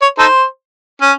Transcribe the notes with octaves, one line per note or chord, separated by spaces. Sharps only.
C#5
D#4 A4 C5
C#4